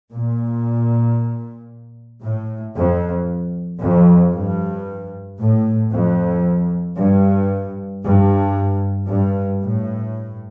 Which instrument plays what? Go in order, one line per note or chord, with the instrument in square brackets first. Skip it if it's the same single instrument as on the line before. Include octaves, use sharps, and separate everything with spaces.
[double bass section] A#2
A2
F2
F2
G2
A2
F2
G2
G2
G2
A2